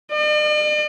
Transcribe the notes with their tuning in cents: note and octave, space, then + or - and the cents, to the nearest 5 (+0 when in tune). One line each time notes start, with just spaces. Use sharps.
D5 +45